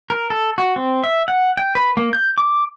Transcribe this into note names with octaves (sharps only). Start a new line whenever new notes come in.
A#4
A4
F#4
C4
E5
F#5
G5
B4
A#3
G6
D6